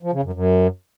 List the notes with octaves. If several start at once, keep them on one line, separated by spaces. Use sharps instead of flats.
F3
C#3
F#2
F#2